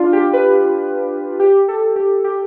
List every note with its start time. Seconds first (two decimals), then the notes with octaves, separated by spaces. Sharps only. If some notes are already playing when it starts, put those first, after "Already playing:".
Already playing: D4 F4
0.13 G4
0.33 B4
1.40 G4
1.68 A4
1.96 G4
2.24 G4